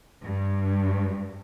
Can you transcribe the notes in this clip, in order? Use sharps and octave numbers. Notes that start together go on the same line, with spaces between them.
G2